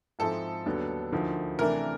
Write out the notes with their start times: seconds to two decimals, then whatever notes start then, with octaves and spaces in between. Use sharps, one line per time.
0.19 G#2 F3 G#3 C4 E4 A4
0.66 D#2 D3 F#3 B3 D4
1.12 D2 D3 F3 A#3 D#4
1.59 C3 E3 A3 D4 A#4